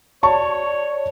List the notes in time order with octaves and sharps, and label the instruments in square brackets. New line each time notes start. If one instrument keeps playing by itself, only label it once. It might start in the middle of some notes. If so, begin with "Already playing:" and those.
[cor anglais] C#5 [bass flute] D5 [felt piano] A5 C#6